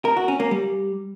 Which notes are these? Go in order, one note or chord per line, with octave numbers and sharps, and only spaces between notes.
A#4
F#4
C#4
A#3
G3